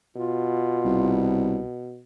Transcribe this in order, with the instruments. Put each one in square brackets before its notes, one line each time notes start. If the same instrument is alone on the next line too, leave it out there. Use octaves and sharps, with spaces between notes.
[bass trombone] B2 [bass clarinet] F4
[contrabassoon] C2